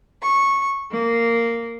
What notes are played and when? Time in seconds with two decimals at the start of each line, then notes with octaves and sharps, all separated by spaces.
0.23 C#6
0.91 A#3